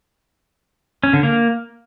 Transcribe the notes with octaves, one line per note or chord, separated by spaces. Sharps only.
C#4
D3
A#3